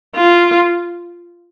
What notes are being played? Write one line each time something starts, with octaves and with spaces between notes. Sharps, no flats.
F4